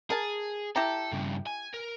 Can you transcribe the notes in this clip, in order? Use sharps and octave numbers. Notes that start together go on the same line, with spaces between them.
G#4 A#4 A5
E4 G4 A4 A#5
G2 C#3
G#5
A#4